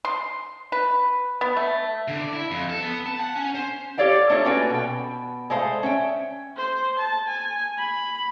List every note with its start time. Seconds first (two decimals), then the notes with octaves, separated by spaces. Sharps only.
0.05 C6
0.72 B4
1.41 B3
1.57 A3
2.08 D3
2.21 D5
2.33 E4
2.51 F2
2.69 A4
2.82 B3
3.06 A5
3.20 F#5
3.36 C#4
3.55 C5
3.98 G4 A4 C#5 D5 F5 G5
4.30 A3 D4 D#4 F4 C#5
4.45 A#3 C#4 F#4 A4 B4 G5
4.70 B2 G5
5.50 G#3 A3 C5 F5
5.83 C#4 E5 G5
6.57 C5
6.98 A5
7.27 G#5
7.78 B5